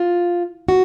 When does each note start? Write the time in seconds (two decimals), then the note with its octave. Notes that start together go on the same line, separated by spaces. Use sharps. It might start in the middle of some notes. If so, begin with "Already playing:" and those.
Already playing: F4
0.68 F#4